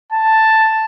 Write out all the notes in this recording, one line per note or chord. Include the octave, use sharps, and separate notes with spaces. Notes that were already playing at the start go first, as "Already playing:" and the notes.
A5